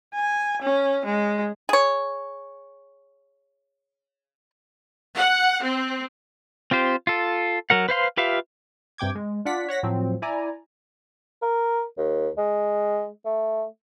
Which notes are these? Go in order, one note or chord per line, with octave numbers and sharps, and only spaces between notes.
G#5
C#4
G#3
G#4 C#5
F#5
C4
C4 F4 G4 C5
F4 A4
F#3 A#4 F#5
B4 C5 F5 C6
F4 G4 B4 E5 F5
G2 C3 G5 D6 G#6
G#3
D4 F4 D5 F#5 B6
C#5 F#5 A#6 B6
A2 F3 F#3 C4
E4 D5 G#5 A#5
A#4
D#2
G#3
A3